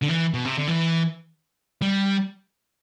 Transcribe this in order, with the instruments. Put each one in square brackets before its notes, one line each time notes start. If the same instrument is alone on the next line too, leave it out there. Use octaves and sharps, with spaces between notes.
[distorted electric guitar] D3
E3
B2
C3
D3
E3
G3